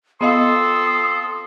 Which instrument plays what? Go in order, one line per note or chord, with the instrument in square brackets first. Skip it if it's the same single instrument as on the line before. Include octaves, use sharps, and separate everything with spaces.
[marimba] B3 D#5 F5 [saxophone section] C4 F4 A4 [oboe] C6 [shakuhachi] D#6